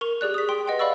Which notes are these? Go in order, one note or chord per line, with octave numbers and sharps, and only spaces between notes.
A#4 C#6 F7
G4 G#4 D5 F#6
D#6 B6
G5 C6 D7
B4 D#5 F#5 G5
D5 F5 B5 C#6 E6 A6